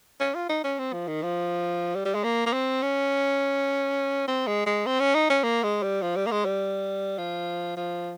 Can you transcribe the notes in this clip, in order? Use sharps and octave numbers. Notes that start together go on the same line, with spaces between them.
C#4
F4
D#4
C#4
C4
F3
D#3
F3
G3
G3
G#3
A#3
A#3
C4
C#4
C4
G#3
G#3
C4
C#4
D#4
C#4
A#3
G#3
G3
F3
G3
A#3
G#3
G3
F3
F3